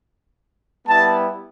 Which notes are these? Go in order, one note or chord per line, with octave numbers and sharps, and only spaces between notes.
G3 B3 E4 A5